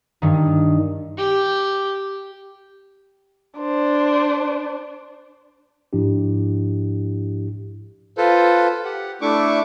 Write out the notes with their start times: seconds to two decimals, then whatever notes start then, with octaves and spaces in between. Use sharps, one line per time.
0.22 G2 D#3
1.18 G4
3.57 D4 C5
5.93 G#2 F3 D4 E4 G4
8.18 F4 A4 B4 C5
8.85 G4 F#5
9.21 A3 D4 E4 C#6 D6